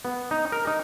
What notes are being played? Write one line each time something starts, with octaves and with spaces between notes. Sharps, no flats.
B3
D#4
A#4
D#4